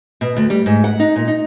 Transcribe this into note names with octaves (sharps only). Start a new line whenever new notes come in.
B2
D2
G3
G#2
F#5
D#4
A#2
D#4